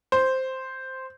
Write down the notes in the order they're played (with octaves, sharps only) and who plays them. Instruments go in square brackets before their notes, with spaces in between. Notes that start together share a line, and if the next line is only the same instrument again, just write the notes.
[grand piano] C5